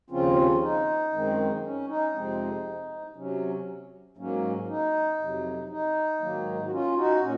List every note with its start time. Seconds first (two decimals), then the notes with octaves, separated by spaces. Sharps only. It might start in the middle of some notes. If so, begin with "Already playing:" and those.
0.10 D#2 C#3 F3 C4 C#4 F4
0.61 D#4
1.13 F#2 D#3 G#3 C4
1.63 C#4
1.88 D#4
2.14 F2 C3 F3 G#3 C4
3.15 C3 F#3 C#4
4.17 G#2 F#3 A#3 C#4
4.68 D#4
5.19 F2 C3 F#3
5.69 D#4
6.21 G#2 D#3 F#3 A#3
6.66 F#4
6.72 C#4 F4
6.97 D#4 F#4
7.22 A#2 C#4